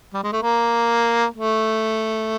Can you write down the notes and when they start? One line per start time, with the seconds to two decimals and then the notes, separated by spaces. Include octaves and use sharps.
0.14 G3
0.23 G#3
0.33 A3
0.42 A#3
1.34 A3